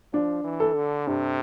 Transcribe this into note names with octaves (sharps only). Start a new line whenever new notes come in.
F3 D4
E3
A4
D3
G2 C3